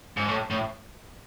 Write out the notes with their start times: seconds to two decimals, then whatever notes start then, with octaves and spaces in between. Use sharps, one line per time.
0.17 G#2
0.28 A2
0.51 A2